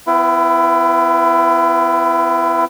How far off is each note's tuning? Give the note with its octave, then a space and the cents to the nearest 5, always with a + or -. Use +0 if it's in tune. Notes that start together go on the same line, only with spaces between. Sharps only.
B3 +45 E4 +30 B4 -10